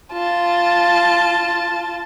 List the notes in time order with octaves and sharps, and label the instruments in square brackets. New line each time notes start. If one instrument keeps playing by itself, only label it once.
[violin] F4 A5